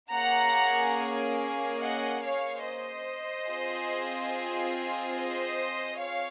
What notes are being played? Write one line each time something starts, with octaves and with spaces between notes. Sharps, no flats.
A#3 C#4 G#4 F#5 A#5
D#5 F#5
C#5 F5
C5 D#5
C4 F4 G#4
C5 D#5
C#5 F5